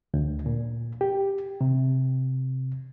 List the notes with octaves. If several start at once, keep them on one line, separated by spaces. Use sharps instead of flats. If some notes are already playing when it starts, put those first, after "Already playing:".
D2
A#2
G4
C3